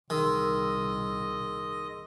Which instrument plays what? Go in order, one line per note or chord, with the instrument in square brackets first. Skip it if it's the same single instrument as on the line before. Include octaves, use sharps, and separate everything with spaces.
[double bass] C2 A#2 [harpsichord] D#3 [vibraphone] G#4 C6 E6 [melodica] D#5